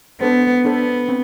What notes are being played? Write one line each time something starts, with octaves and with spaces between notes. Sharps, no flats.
B3 D4 A4 C5
B3 D4 A4 C5
C4